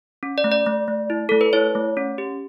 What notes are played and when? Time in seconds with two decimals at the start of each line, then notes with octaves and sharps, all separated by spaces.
0.23 C#4
0.38 D5
0.44 A3
0.52 D5
0.66 A3
0.88 A3
1.10 E4
1.29 A3 A4
1.41 B4
1.53 E4 C#5
1.75 A3
1.97 C#4
2.18 G4